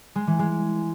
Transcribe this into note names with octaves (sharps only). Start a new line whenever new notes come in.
G#3
E3
G#3